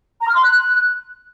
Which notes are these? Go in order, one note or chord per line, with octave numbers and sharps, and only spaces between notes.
A#5
F6
C6
F#6